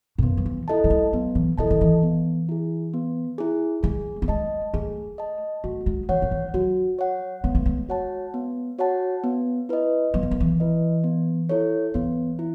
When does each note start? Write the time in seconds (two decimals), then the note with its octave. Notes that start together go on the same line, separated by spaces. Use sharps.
0.18 G#2
0.22 F#2 B3
0.37 F#3
0.46 E3
0.68 E4 A4 D#5 A5
0.84 F#3
0.90 G#3
1.13 F#3 B3
1.35 E3
1.58 D#3 E4 A4 D#5 A5
1.70 D#3
1.81 E3
2.03 B3
2.49 E4 G#4
2.94 B3
3.38 E4 G#4
3.83 G#3 G#4
4.22 A3
4.28 G#3 D#5 A5
4.74 A3 G#4
5.18 D#5 A5
5.64 A3 F#4
5.86 G#3
6.09 E3 C#5 F#5
6.22 D#3
6.31 E3
6.54 F#3 F#4
6.99 C#5 F#5
7.44 G#3 B3
7.55 A3
7.66 G#3
7.89 F#4 C#5 F#5 A5
8.34 B3
8.78 F#4 C#5 F#5 A5
9.24 B3
9.69 E4 B4 D#5
10.14 F#3 B3
10.23 E3
10.31 D#3
10.40 E3
10.60 E4 B4 D#5
11.04 B3
11.49 E4 A4 C#5
11.94 E3 B3
12.39 E4